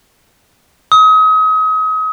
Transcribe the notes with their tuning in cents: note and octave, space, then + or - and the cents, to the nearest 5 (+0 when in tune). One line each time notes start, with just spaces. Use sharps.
D#6 +35